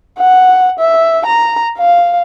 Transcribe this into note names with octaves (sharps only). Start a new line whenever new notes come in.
F#5
E5
A#5
F5